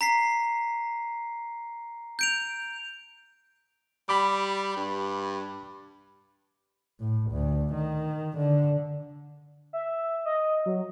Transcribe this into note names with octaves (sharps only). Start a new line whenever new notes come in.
A#5 B6 C7
G6 D7 F7
G3 B5 D6
G2
A2
D2
D#3
D3
E5
D#5
F#3